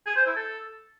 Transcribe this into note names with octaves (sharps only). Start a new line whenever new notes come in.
G#4
C5
E4
A4